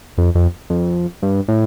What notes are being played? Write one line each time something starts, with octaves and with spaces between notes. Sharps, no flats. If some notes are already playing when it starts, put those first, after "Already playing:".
F2
F2
F2
G2
A2